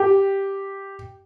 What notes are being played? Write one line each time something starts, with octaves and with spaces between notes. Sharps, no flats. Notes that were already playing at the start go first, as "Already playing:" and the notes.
Already playing: G4